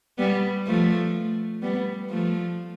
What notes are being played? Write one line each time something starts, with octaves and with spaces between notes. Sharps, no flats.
G3 B3
F3 A3
G3 B3
F3 A3